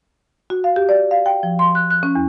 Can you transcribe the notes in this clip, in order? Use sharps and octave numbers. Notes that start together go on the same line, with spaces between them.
F#4
F5
G4
D5
F5
G5
F3
C6
F#6
F#6
C#4
E2